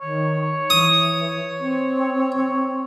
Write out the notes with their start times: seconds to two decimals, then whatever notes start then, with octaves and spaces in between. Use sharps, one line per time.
0.01 D#3 C#5
0.70 E3 D#6
1.60 C4